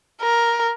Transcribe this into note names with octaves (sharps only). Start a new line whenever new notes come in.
A#4